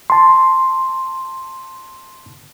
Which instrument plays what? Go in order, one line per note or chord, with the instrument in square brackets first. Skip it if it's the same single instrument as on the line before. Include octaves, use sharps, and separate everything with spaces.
[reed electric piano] A5 C6